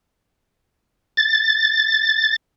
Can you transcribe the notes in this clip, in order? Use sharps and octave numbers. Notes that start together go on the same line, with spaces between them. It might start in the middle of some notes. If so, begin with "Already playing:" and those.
A6